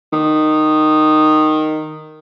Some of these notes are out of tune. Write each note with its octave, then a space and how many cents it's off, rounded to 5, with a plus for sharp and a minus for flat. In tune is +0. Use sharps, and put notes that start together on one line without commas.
D#3 -10